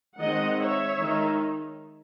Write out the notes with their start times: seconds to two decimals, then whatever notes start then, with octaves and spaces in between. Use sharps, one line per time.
0.20 D#3 G#3 C4 D#4 D#5 F#5
0.60 C#5 E5
1.00 D#3 G#3 D#4